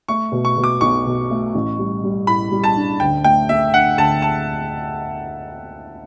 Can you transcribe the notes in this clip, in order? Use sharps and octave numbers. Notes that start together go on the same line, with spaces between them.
A3 C#6
B2
C#6
B2
D6
B1 C#6
B2
A3
A1
G3
G3
A2 B5
G3
A5
D4
D2 G5
A3 G5
A3 E5
D3 F#5
D2 A5
A5